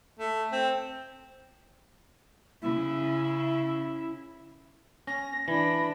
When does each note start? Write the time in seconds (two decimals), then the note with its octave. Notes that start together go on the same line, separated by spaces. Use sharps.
0.19 A3
0.52 C4
2.62 C#3 E4
5.07 C#4 A#6
5.48 E3 D4 B5 A#6